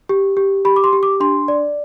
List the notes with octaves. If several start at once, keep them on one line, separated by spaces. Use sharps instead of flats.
G4
G4
G4 B5
D6
C6
G4
D6
D4 C6
D5